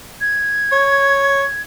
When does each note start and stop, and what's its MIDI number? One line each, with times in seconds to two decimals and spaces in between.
0.21 1.62 92
0.72 1.44 73